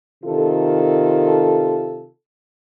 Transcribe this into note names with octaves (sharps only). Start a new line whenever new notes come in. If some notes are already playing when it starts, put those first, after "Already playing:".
C3 D#3 F4 A4